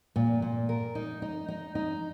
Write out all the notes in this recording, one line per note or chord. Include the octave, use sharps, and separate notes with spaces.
A#2
A#2
A#4
D#4
D#4
D#4
D#4